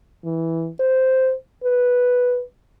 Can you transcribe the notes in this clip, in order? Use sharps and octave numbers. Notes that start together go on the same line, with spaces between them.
E3
C5
B4